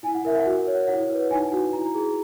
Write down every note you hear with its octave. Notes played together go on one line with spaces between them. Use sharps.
E4 G#5
F#5
A#4 E5
F#5
F#4
C#5
E4 F#5
B4
D#4 G#5
F#4
E4 A#5
G#4